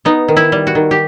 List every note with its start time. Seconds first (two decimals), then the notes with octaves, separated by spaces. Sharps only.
0.05 B3 D#4
0.28 D#3
0.37 E4
0.52 G3
0.67 F#4
0.75 D#3
0.91 G4